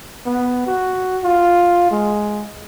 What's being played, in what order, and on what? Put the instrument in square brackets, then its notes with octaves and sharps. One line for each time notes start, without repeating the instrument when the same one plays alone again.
[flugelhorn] B3
F#4
F4
G#3